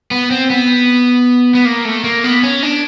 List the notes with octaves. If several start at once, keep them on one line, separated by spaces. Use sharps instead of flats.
B3
C4
B3
B3
A#3
A3
A#3
B3
C#4
D4